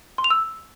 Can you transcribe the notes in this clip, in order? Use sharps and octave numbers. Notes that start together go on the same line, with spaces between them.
C6
F7
E6